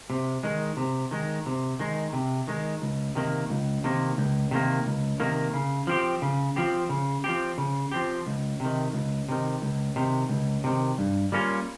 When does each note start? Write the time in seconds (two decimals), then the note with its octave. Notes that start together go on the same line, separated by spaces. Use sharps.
0.10 C3
0.43 D#3 G#3
0.77 C3
1.11 D#3 G#3
1.46 C3
1.79 D#3 G#3
2.13 C3
2.48 D#3 G#3
2.82 C#2
3.15 C3 D#3 A#3
3.50 C#2
3.84 C3 D#3 A#3
4.18 C#2
4.51 C3 D#3 A#3
4.86 C#2
5.20 C3 D#3 A#3
5.54 C#3
5.87 F3 C4 G4
6.22 C#3
6.56 F3 C4 G4
6.89 C#3
7.24 F3 C4 G4
7.58 C#3
7.92 F3 C4 G4
8.27 C#2
8.60 C3 D#3
8.93 C#2
9.29 C3 D#3
9.62 C#2
9.96 C3 D#3
10.29 C#2
10.64 C3 D#3
10.98 G2
11.32 G3 A#3 C#4 F4